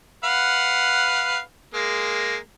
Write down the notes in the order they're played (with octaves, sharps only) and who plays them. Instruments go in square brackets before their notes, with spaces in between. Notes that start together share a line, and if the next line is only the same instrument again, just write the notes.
[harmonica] B4 F5 F#5
G#3 A#3